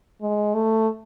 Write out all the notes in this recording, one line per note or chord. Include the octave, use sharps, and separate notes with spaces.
G#3
A3